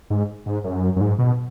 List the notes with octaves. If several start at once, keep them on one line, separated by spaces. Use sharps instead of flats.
G#2
G#2
F#2
F#2
G#2
B2